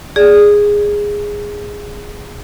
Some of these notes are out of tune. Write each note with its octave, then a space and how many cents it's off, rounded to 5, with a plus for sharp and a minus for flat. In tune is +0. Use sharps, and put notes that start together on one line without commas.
G#4 -10 D5 +0